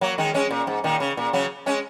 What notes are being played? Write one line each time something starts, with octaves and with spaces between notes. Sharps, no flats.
F#3 A#3
D#3 G#3
G#3 C#4
A#2
G#2
A#2 D#3
C#3
A#2
C#3 F#3
G#3 C#4